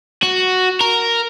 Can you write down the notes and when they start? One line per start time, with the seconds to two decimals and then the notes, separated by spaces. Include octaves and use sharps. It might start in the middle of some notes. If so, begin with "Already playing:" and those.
0.23 F#4
0.81 A#4